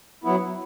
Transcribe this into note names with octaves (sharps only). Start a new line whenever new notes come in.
F#3 B3 E4